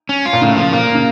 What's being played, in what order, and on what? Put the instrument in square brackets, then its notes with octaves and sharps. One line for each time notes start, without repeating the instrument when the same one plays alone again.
[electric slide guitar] C#4
F4
[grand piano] A#2
[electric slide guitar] A2 [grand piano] C#3
[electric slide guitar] F3
[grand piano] A#2 [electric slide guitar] A#3
[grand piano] C#3